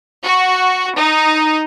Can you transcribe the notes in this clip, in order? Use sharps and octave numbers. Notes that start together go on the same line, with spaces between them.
F#4
D#4